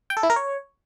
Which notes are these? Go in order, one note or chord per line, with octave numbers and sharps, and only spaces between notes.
G5
A4
E4
A#4
C#5